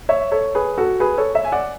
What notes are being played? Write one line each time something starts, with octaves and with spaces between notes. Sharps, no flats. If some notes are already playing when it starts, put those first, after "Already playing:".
C#5 E5
A4 C#5
G#4 B4
F#4 A4
G#4 B4
A4 C#5
C#5 E5
G#5
D5 F#5